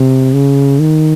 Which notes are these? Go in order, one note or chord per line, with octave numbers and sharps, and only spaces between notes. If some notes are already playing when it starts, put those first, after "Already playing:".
Already playing: C3
C#3
D#3